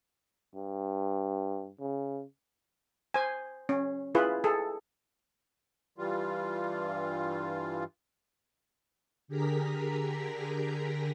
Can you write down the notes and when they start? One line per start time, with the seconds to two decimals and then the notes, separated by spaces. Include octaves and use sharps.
0.55 G2
1.80 C#3
3.14 C5 G#5
3.69 C#4
4.15 E4 F4 G#4 B4
4.44 G#4 A4
5.98 G2 E3 G3 F4
9.28 D3 G4 G#4 A#4 A#5 B6